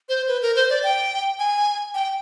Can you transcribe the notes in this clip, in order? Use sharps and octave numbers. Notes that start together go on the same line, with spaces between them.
C5
B4
A#4
C5
D5
G5
G#5
G5